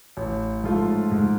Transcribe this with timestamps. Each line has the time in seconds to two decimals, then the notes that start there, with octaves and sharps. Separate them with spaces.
0.17 A1
0.64 G#2 F3 A3 F4
1.12 G#2